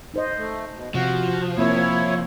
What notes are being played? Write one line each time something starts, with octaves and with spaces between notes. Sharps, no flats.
D#4 C5 D#5
A3
B2
C3 F3 F#4
A#3 C4 E4 C#5